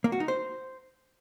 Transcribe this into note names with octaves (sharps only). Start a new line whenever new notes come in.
A#3
F#4
D#4
C5